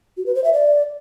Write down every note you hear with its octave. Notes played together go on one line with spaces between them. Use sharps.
F#4
B4
C5
E5
D5